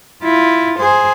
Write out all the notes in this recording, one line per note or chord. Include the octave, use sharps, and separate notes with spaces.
E4 F4
G#4 C5